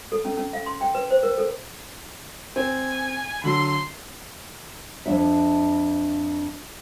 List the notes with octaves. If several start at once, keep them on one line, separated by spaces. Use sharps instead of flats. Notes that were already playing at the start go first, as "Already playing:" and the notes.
A4
C#4
C#4
F5
C6
G5
B4
C5
A#4
A4
C4 G#5
D3 F#3 C6
F2 D4 E5